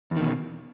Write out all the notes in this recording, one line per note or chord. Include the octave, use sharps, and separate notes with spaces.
E2 B2 D#3